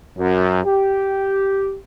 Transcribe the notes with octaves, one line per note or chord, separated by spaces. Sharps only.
F#2
G4